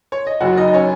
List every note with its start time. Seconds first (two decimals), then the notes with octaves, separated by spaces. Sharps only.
0.12 C#5
0.27 D#5
0.41 F#1 F#2 F#3 F#4 F#5
0.57 D#4 D#5
0.68 D#5
0.74 C#4 C#5